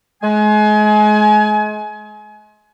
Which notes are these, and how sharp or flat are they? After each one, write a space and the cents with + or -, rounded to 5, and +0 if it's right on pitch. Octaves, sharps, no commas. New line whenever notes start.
G#3 +35 G#5 +30